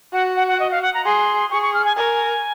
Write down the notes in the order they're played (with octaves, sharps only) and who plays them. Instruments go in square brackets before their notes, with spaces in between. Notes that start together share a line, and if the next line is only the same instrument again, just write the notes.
[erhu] F#4 [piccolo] F#5
[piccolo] F#5
F#5
D#5
F5
F#5
A#5
[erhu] G#4 [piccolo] C6
[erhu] G#4 [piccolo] C#6
[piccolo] C#6
F6
G#5
[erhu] A#4 [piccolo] G#5